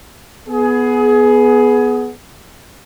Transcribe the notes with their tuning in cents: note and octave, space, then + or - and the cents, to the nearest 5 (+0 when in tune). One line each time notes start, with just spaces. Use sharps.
B3 +0 G#4 +20